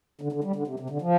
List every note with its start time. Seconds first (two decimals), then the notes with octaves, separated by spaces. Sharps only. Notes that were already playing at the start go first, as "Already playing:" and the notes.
0.21 D3
0.33 D3
0.44 G3
0.56 D3
0.67 C3
0.80 C3
0.90 D3
1.02 F3